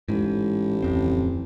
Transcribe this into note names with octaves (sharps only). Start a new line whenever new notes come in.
A1 G#2
D1 F2 C4